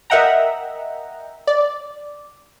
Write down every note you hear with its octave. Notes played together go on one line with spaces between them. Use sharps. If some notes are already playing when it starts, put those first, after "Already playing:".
A#4 D#5 E5 F#5 G5 A#5
D5